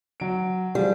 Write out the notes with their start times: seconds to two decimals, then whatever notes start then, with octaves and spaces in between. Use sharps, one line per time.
0.20 F#3 D7
0.75 F3 G3 G#3 F4